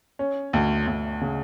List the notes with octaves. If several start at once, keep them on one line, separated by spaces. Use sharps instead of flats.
C#4
D2
D2
C#3